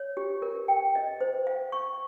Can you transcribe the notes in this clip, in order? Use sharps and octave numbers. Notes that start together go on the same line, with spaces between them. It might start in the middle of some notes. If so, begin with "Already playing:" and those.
Already playing: C#5
G4
A#4
G5
D#5
C5
F5
C#6